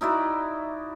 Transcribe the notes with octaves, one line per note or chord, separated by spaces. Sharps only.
D#4 E4 F#4 D5